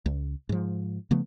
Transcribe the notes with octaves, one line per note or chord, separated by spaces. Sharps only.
C#2
G#2 F3
C#3 F3 A3 B3